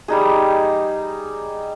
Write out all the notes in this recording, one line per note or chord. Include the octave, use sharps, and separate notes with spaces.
G3 D#4 G#4